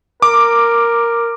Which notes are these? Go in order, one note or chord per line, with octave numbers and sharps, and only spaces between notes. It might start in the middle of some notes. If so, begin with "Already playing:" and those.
A#4 D6